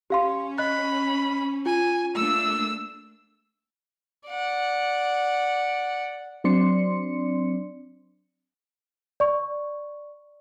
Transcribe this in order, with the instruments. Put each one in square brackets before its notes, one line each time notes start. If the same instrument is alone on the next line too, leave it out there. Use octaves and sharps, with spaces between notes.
[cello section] C#4 [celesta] G4 F5 C6
[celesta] D#5 F#6 [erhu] B5
[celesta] F4 [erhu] G#5
[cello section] A3 A#3 D4 [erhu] E6
[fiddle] D5 F#5
[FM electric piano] F#3 C4 D4 D5 C6 C#7
[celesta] D5 C#6